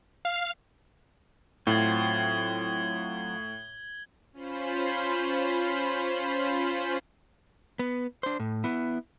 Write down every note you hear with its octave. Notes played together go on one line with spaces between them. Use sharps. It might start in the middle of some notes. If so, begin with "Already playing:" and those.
F5
A2 F#3 C4 F4 G#6 F#7 G7
C#4 F4 C5 B5
B3
D4 C5
A2
B3 E4